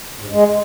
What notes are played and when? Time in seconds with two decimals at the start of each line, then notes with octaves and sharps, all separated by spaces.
0.20 G#2
0.26 G2
0.31 G#3